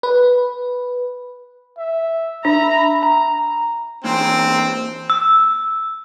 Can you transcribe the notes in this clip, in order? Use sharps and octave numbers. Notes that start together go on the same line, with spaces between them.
B4
E5
D4 E5 A#5 B5
A#5
E3 A#3 C4 C#4
E6